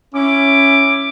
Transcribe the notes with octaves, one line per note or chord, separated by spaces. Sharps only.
C#4 E4 D6